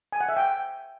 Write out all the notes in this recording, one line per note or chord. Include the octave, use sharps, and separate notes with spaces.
G#5
F#5
E5
G5